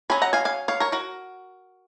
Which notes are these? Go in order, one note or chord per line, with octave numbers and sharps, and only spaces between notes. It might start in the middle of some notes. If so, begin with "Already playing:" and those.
F#3 C#4 G#5 B5
F#5 A#5
F5 G#5
F5 G#5
C#5 F5
A#4 C#5
F#4 A#4